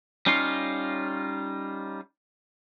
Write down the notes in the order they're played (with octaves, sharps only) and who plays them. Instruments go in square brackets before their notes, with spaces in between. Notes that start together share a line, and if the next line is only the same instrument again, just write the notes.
[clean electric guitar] G3 C#4 D#4 F4 C#5 F5